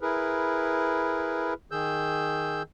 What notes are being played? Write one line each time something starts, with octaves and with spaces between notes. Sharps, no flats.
E4 G#4 A#4 B4
D#3 G#4 E6 G6